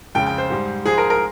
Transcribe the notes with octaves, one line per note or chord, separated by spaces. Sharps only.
F2 C#3 G#3 G5
G5
C5
G#2 G3
G#2 F3 G#3 G#4
A#4
A#4